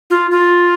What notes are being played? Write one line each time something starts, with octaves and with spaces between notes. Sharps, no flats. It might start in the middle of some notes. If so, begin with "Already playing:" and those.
F4
F4